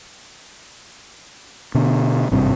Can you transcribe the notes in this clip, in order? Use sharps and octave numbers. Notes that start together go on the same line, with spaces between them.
B2 D3
G#1 G2 C3